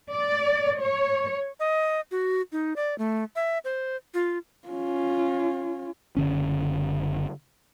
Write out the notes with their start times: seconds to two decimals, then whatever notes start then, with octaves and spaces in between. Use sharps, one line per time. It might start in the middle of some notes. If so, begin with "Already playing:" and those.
0.10 D5
0.80 C#5
1.60 D#5
2.11 F#4
2.52 D#4
2.76 D5
2.98 A3
3.36 E5
3.65 C5
4.14 F4
4.68 C#4 F4
6.17 F#1 D3 C#4